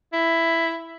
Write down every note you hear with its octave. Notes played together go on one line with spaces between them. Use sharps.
E4